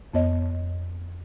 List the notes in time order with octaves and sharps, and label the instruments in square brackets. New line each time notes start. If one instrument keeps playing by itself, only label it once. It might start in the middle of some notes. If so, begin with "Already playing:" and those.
[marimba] F2 B3 C#5 D#5